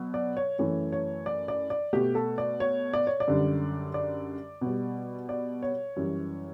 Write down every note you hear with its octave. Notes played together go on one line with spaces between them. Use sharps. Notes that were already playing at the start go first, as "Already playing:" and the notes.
Already playing: B2 F#3
D5
C#5
F#2 E3 A3 C#5
C#5
D5
D5
D5
B2 A3 G4
A4
D5
C#5
D5
C#5
D5
F#2 D3 G3
D5
B2 G3
D5
C#5
F#2 E3 G3